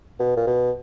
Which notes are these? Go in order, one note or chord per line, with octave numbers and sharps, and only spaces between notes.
B2
A#2
B2